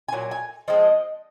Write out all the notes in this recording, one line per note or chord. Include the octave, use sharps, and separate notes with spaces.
G#5
A#2 F#3
G#5
F3 G#3 C4 D#5